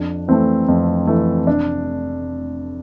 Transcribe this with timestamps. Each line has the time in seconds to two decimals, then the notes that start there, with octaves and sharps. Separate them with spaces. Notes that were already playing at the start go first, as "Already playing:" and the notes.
Already playing: F2 D4
0.28 E3 A3 C4
0.68 F2
1.07 E3 A3
1.47 F1 D4